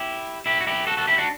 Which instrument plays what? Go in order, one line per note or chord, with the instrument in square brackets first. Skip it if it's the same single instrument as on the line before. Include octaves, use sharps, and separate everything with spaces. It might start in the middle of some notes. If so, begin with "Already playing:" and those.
Already playing: [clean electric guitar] E4 G4
E4 G4
F#4
E4 G4
F#4 A4
F#4 A4
E4 G4
D4 F#4